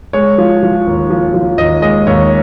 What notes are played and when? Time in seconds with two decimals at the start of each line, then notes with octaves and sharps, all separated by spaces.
0.13 G#3 C#5
0.38 F3
0.63 F3
0.87 D#2
1.10 F3
1.34 F3
1.58 D#2 D#5
1.82 G#3 D#5
2.07 D#2 C#5